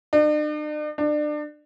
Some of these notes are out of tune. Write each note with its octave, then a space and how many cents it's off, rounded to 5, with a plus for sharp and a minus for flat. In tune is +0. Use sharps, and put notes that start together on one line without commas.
D4 +45
D4 +30